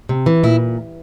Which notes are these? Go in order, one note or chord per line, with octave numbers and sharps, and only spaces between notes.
C3
E3
A#2 E4